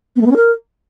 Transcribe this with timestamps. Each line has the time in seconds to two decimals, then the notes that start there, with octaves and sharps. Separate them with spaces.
0.16 B3
0.21 A3
0.26 B3
0.31 C#4
0.36 A#4